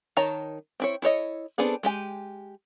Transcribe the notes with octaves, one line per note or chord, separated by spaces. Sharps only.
D#3 C#5 A5 A#5
C4 E4 C#5
E4 A4 C#5 D#5
B3 C4 D4 G#4 A4
G#3 G4 G#5